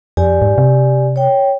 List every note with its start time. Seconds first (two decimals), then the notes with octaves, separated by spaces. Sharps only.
0.17 F2 G4 D5 G#5
0.42 G#2
0.58 C3
1.16 C#5 G5